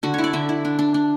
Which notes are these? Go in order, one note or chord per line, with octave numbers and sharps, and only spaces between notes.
D3 F#4
E4 C#5
D5
D3 E5
E4
D4
D4
D4